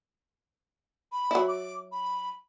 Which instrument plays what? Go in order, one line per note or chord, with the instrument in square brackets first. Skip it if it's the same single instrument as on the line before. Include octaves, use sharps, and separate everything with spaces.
[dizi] B5
[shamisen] F#3 E4
[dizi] D6
B5